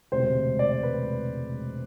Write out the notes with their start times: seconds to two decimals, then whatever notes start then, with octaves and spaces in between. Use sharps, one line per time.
0.12 E1 D2 C3 G#3 C5
0.59 D5
0.83 B4